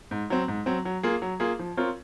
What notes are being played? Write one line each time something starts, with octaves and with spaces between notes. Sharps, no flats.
G#2
F#3 C4
G#2
F#3 C4
F#3
A#3 F4 G#4
F#3
A#3 F4 G#4
F3
C4 F4 A#4 C#5